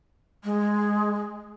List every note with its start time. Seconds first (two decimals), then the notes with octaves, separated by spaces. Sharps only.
0.44 G#3